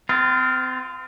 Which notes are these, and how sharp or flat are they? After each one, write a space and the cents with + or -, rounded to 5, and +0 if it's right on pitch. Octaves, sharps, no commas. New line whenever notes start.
C4 -35 F4 +0